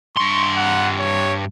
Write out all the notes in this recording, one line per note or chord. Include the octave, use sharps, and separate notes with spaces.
G2 C6 C#6
F#5
C#5